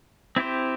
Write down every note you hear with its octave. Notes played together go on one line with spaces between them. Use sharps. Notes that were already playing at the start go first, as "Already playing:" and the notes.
C4 E4 G4 C5